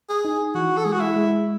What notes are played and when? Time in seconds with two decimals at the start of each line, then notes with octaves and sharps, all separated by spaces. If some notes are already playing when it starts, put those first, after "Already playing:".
0.09 G#4
0.25 D#4
0.55 E3 F#4
0.77 A4
0.84 G#3 G#4
0.92 F#4
1.00 E4
1.16 G#3